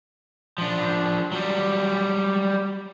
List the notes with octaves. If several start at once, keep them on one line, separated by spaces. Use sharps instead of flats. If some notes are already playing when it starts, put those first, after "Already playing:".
F3 D4
F#3 G3